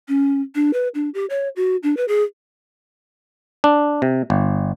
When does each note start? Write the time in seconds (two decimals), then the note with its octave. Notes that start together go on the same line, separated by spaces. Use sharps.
0.08 C#4
0.55 D4
0.73 B4
0.95 D4
1.14 G4
1.30 C#5
1.56 F#4
1.83 D4
1.97 B4
2.08 G#4
3.64 D4
4.02 C3
4.30 G1